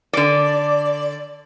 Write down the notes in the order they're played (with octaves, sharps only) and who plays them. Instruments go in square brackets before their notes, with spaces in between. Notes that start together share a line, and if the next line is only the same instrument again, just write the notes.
[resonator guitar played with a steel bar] D3 D5